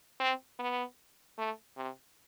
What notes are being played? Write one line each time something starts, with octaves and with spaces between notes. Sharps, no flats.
C4
B3
A3
C3